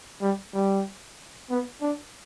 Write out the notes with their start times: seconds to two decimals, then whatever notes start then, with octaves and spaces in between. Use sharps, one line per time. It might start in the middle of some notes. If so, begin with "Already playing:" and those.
0.21 G3
0.54 G3
1.50 B3
1.82 D4